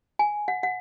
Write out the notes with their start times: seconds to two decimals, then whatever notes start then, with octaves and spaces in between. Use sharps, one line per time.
0.19 G#5
0.48 F#5
0.63 F#5